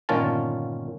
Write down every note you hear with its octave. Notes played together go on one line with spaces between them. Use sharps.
G1 A#2 D#3 C#4 F4 A5